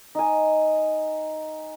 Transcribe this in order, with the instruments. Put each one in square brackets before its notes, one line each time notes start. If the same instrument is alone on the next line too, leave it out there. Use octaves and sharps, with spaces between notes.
[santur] D#4 G#5